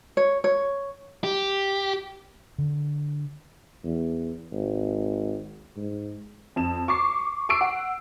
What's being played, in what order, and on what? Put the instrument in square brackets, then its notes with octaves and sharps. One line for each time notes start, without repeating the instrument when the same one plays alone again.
[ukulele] C#5
C#5
[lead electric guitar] G4
[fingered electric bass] D3
[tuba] E2
G#1
G#2
[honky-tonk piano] F2 E7
C#6 D6 C7
C#6 D6 E6 C7 D7
F#5